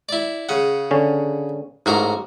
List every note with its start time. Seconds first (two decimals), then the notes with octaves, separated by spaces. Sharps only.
0.09 E4 D5
0.49 C#3 F#5
0.91 D3 C#4
1.86 A1 G#2 F#4 A#4